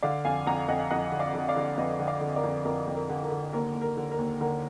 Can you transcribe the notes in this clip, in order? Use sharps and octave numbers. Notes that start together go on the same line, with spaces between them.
D3 D5 F5
F2 F5 G#5
F2 F#5 A#5
F2 D#5 F#5
F5
F2 D#5 F#5
D3
D5 F5
D3
D5 F5
D3
F2 B4 D#5
D3
D5 F5
D3
A#4 D5
F2
F2 A#4
F2
A#4
D3
A#4
D3
D#2 A#4
D#2
A#4
D3
A#4
D#2
D3 A#4